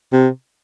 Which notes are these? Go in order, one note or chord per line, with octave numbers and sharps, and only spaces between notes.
C3